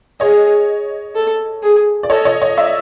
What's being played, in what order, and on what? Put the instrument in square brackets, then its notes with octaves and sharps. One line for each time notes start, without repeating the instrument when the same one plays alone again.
[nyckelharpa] G#4 [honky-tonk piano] C#5 D#5
[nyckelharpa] A4
G#4
[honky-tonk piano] D5
[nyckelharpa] A4 [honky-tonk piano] C#5 D#5
[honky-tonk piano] C#5 D#5
C#5 D#5
D5 E5